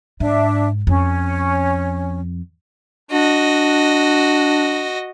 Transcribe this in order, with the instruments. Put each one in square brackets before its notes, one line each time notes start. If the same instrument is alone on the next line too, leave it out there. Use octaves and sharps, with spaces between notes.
[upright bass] G#2 [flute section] D4 E5
[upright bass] F2 [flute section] C#4
[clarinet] D4 [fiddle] F#4 D#5